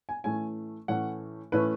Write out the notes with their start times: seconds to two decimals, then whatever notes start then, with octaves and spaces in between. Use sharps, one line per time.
0.09 G#5
0.24 A2 E3 A3 C#4 G#5
0.88 A2 E3 A3 C#4 F#5
1.52 A2 E3 A3 C#4 B4